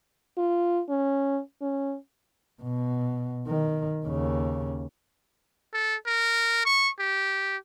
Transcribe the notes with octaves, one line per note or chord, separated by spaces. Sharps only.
F4
C#4
C#4
B2
D#3
D#2 C#3
A4
A#4
C#6
G4